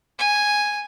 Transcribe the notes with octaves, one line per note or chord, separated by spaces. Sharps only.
G#5